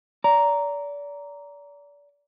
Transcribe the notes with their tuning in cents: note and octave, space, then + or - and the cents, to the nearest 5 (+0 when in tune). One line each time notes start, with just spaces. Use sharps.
D5 -30 A#5 +0